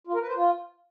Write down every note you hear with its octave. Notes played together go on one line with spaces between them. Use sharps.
F4
A#4
B4
C5
F4